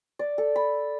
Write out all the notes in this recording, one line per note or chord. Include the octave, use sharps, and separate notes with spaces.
D5
A4
B5